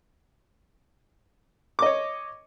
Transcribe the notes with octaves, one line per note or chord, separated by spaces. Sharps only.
C#5 D#5 D6